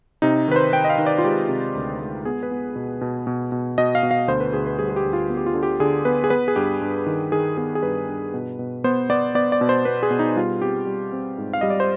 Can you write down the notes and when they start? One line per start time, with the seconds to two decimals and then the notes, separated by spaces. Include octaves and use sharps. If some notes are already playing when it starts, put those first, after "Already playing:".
0.22 C3 D#4
0.48 D#3 B4
0.56 C5
0.73 D#3 G5
0.85 D#5
0.90 F5
0.98 D#3
1.06 D5
1.19 F4
1.24 G#3 G4
1.49 C3
1.75 D2
2.00 G#3
2.25 B3 G#4
2.43 B4
2.51 B3
2.76 B2
3.01 B2
3.27 B2
3.52 B2
3.78 B2 D#5
3.95 F5
4.03 B2
4.11 F5
4.28 D2 C5
4.40 B4
4.53 D2 G#4
4.67 B4
4.79 G3 G#4
4.89 G#4
4.96 G4
5.04 D2
5.13 F4
5.30 B3
5.37 G4
5.46 F4
5.54 D3
5.63 G4
5.80 D3 G#4
6.05 B3 B4
6.24 G#4
6.30 B3 B4
6.48 G#4
6.56 G2 G4
6.81 G2
7.06 D#3
7.32 D#3 G#4
7.57 B3 G#4
7.75 G#4
7.83 G2 B4
8.09 G2
8.34 B2
8.59 B2
8.84 B3 C5
9.10 B3 D5
9.35 B3 D5
9.52 D5
9.61 B2
9.69 C5
9.85 B3 B4
10.03 G#4
10.11 B2
10.19 D#4
10.36 G3 F4
10.61 C4 G4
10.87 G3
11.13 C4
11.38 G#2
11.53 F5
11.61 G3 D#5
11.70 D5
11.80 C5